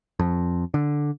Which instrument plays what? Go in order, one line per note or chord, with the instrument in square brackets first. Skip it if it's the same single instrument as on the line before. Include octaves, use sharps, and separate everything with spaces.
[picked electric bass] F2
D3